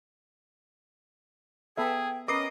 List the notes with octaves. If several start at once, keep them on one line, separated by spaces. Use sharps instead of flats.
B3 G#4 A4 E5 G5
C#4 A#4 B4 D#5 D6 D#6 C7